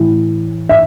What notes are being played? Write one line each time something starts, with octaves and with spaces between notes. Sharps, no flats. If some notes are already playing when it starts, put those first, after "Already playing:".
Already playing: A2 E3
E5